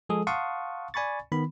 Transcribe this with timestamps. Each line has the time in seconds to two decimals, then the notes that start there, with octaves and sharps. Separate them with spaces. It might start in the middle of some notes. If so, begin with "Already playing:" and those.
0.09 F3 G#3 G#4 A4 D#6
0.27 F5 F#5 A5 C6 C#6 D#6
0.94 D5 G#5 B5 C#6 A6
1.32 D#3 B3 B5